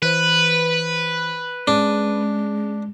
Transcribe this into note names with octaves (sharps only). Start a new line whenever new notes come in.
E3 B4 C5
G#3 C#4 D4 G#4